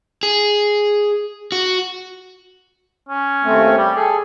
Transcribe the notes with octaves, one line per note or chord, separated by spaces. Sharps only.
G#4
F#4
C#4
D#2 A3 C4
G3 G4
G#4 A4